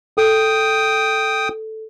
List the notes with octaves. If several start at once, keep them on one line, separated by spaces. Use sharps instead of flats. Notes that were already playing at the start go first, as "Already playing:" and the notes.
A4 G5 D#6